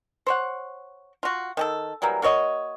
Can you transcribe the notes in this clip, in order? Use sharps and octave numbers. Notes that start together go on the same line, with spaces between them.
C5 C#5 F#5
F4 F#4
D#3 G4 A4
E3 F#3 G3 A#3
A#3 F#4 C#5 D#5